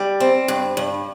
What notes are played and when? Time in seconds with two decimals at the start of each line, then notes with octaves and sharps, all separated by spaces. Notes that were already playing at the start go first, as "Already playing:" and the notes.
Already playing: G3
0.20 C4
0.48 G2
0.77 G2